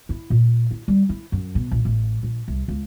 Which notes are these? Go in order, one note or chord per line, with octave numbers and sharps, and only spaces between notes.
E4
A#2
E4
G3
E4
F#2
B2
A#1
A1
A#1
C2
C#2